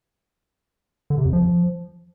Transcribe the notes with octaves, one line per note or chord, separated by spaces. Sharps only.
D3
C3
F2
F3